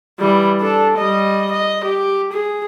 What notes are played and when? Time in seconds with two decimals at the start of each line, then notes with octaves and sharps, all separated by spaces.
0.19 E3 G3
0.60 D4 A4
0.98 G3 D#5
1.52 D#5
1.84 G4
2.32 G#4